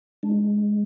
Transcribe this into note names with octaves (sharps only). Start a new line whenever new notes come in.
G#3 D4